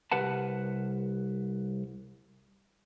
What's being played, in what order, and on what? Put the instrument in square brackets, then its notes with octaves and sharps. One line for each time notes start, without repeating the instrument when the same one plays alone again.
[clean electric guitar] C2 G4 A#4 B4 F#5 A5